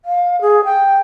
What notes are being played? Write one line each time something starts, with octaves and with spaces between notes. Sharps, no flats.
F5
G#4
G5